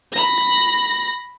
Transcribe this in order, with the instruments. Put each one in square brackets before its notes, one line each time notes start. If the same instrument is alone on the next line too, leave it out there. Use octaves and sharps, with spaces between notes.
[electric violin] B5 A#6